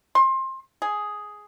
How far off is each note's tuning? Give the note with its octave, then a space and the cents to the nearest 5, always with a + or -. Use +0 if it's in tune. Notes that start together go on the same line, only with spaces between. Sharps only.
C6 +25
G#4 +5